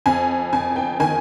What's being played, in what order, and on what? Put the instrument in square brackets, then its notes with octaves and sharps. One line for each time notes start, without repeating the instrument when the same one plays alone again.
[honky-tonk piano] F2 G#5
F2 G#5
G5
D#3 G#5